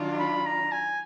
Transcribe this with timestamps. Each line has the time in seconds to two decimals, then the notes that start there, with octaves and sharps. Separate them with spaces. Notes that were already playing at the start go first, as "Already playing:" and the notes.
Already playing: D#3 F#3 D4 F4
0.19 B5
0.46 A#5
0.72 G#5